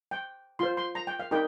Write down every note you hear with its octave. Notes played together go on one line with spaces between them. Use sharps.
G5
F4 C5 C6
C6
A#5
G5
F5
D#4 G4 A#4 G5